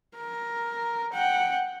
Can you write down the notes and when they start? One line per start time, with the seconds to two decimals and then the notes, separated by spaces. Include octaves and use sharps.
0.16 A#4
1.13 F#5 G5